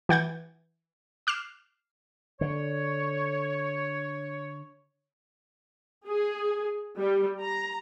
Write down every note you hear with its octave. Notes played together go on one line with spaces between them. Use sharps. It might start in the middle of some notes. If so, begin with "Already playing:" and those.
E3 F#5 G6 G#6
D6 F6 C7 E7
D3 C#5
G#4
G3
A#5